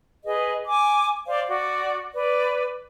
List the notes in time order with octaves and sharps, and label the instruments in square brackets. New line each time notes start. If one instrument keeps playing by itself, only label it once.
[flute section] G#4 B4 D#5
G#5 D6
C5 D5 F5
F#4 D5
B4 D5